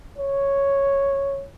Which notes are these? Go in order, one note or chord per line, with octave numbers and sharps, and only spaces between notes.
C#5